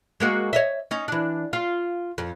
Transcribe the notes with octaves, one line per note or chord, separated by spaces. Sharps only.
G#3 A#3 F#4
C#5 D#5 E5
C#4 D#4
E3 D4
F4
F2